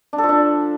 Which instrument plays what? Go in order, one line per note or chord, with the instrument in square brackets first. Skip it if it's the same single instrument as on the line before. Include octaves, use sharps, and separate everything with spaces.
[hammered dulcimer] D4
A4
F3
D4